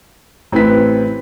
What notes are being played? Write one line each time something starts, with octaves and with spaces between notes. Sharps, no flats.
A1 C4 E4 B4 B6